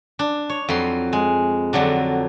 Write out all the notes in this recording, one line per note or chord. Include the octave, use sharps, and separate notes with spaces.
D4
C#5
F2 F#3 B5 C6
G#3
F2 D3 F#3 D4